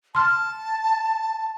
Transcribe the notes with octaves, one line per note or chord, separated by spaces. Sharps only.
A5 C6 F6